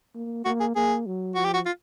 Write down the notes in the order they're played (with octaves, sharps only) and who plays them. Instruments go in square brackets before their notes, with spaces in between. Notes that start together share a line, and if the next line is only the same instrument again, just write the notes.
[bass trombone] A#3
[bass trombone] A#3 [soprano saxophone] F#4
[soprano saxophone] G#4
[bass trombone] A#3 [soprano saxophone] G#4
[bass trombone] F#3
[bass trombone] F3 [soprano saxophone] F#4
[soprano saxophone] G4
F#4
F4